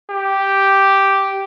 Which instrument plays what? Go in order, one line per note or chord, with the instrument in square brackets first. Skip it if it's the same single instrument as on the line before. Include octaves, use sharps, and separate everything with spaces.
[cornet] G4